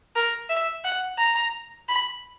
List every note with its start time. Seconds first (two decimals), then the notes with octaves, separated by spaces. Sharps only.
0.16 A#4
0.49 E5
0.84 F#5
1.19 A#5
1.88 B5